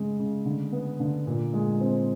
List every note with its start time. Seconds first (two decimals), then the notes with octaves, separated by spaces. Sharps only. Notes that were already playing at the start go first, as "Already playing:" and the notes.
Already playing: C#3 G#3
0.19 C#3
0.45 D3
0.72 B3
1.00 D3
1.27 A#2
1.53 G#3
1.81 C4